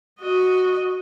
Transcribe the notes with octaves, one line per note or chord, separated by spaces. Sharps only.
F#4 D#5